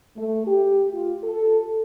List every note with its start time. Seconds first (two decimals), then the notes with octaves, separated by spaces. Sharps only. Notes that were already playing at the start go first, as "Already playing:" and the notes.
0.18 A3
0.47 G4
0.93 F4
1.24 A4